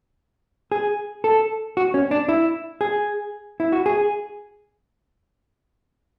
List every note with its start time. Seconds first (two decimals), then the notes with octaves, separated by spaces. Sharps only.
0.72 G#4
1.24 A4
1.77 F#4
1.94 C#4
2.11 D4
2.28 E4
2.81 G#4
3.60 E4
3.72 F#4
3.86 G#4